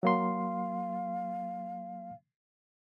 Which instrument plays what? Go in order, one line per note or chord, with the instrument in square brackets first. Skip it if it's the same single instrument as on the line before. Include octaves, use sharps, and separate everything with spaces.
[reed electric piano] F#3 A#3 C6 [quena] F5